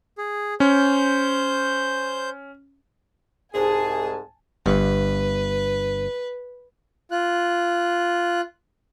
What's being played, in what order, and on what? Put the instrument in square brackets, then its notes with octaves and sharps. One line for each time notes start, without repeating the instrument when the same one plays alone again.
[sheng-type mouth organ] G#4
[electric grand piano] C#4 [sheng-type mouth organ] C5 G6
[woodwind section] C2 G#2 [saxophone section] G#4 [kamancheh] G#5 A5
[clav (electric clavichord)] G1 G2 [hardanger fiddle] B4
[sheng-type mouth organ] F4 F#6